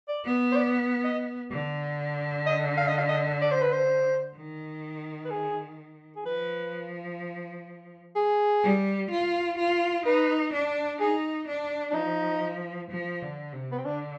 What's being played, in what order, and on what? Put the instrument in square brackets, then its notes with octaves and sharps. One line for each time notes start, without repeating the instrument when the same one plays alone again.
[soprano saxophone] D5
[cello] B3
[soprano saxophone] C5
D5
D#5
[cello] D3
[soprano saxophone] D#5
F5
D#5
F5
D#5
D5
C5
B4
C5
[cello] D#3
[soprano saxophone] B4
G#4
G#4
[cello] F3 [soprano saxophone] B4
[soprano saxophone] G#4
[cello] G3
F4
F4
[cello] D#4 [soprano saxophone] B4
[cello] D4
[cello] D#4 [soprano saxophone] G#4
[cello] D4
[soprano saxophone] D4
[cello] F3 [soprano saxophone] D#4
[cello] F3
D3
C3
[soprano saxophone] B3
C4
[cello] D3 [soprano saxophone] D4